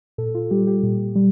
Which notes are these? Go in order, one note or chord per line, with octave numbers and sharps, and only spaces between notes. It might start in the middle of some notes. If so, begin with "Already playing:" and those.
A#2 A4
F4
G3 G4
G4
A#2
G3